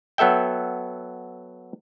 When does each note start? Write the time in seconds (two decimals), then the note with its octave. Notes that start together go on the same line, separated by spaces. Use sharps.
0.18 F#3 B3 A4 E5 G5